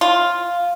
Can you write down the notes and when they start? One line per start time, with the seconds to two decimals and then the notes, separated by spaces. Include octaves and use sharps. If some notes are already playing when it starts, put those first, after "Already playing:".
0.01 F4